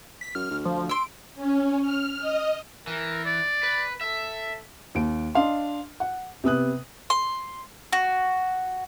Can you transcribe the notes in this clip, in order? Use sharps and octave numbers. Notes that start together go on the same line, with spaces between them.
B6
F#2 F6
D2
F3
C6 E6 D7
C#4
F6
D#5
E3 A#4
D5
B4
A4 E5
D#2 D7
D4 D#5 F5 C6
F#5
C3 B3 D#6 F#6
C6
F#4